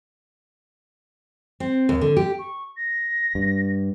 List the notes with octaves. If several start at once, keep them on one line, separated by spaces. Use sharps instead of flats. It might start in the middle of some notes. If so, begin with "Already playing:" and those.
C4
D#2
D3
G4
C#6
A#6
G2